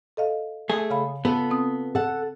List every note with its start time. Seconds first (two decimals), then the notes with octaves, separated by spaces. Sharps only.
0.17 A4 D#5 F5
0.69 A3 G#4
0.90 C#3 F5 B5
1.25 B3 F4 A4
1.50 C4 D#6
1.95 A4 F#5